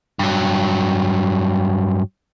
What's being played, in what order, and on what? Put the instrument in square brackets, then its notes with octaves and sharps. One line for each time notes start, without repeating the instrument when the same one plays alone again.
[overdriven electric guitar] G2 F#3